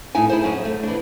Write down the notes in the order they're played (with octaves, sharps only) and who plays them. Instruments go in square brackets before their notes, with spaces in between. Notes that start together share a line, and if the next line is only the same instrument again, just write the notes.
[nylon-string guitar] A2 D#4 E4 G#5
E4 G#4 C5
F#2 D#5
A3
E3 D4